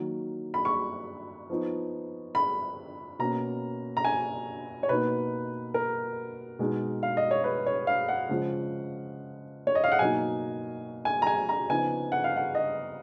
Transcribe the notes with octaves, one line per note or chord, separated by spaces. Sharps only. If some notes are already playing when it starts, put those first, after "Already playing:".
Already playing: D#3 F#3 A#3
B5
C#6
F3 B3 D#4
B5
B2 A#3 C#4 A#5
A#5
G#5
C#5
B2 A#3 D#4 B4
A#4
B2 G#3 D#4
F5
D#5
C#5
B4
C#5
F5
F#5
C#3 F3 G#3
C#5
D#5
F5
F#5
B2 F#3 A#3 D#4 G#5
G#5
A#5
G#5
A#5
C#3 F3 B3 D#4 G#5
F#5
F5
F#5
D#5